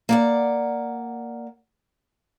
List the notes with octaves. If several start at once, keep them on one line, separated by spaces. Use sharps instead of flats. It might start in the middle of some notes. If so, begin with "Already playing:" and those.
A#3 D5 F#5